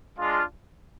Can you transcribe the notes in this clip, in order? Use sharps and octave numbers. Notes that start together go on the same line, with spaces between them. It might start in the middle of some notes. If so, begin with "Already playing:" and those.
G#3 D4 F4